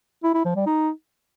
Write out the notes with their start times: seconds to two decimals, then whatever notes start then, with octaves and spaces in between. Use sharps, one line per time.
0.24 E4
0.34 E4
0.45 F3
0.56 G3
0.66 D#4